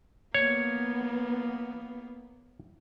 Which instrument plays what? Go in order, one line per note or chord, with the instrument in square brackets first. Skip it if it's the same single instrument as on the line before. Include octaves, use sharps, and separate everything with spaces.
[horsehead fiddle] A#3 B3 [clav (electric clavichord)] C#5